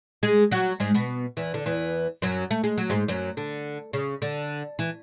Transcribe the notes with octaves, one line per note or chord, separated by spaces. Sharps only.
G#3 G#4
F#3 F#4
G#2 G#3
B2 B3
E2 E3
D3
E2 E3
F#2 F#3
A3
G#3
F#3
G#2 G#3
F#2 F#3
D3
C#3
D3
E3